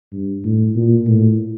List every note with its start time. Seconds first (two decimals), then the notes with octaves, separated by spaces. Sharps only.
0.12 G2
0.44 A2
0.76 A#2
1.07 A2